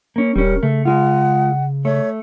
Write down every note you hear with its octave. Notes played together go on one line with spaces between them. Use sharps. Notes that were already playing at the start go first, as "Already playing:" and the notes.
A#3 C#4
D#1 G3 C#4 A#4
C#3 A3
G#3 F4 F#5
A3 C#5